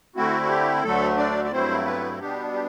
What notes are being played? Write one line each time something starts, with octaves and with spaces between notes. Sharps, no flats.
D3 A3 C4 E4 F#4
F#4
G4
D2 D3 F#3 A3 A4
D4 D5
D5
G2 F#3 A3 C4 E4 C5
B3 B4
B2 G3 B3 D4 G4
G4